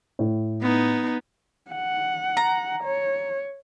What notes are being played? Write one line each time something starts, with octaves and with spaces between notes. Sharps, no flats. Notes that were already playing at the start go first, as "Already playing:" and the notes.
A2
B3 D#4
F#5
A#5
C#5